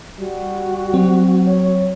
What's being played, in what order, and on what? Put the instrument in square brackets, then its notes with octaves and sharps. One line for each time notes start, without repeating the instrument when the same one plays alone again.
[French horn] G3 [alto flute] F#4
[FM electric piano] F#3 C4
[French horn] C#5